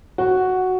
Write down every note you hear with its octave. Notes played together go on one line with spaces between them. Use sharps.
F#4